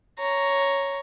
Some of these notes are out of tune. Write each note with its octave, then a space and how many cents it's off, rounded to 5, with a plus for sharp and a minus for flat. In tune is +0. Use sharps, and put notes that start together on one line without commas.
C#5 +0 A#5 +0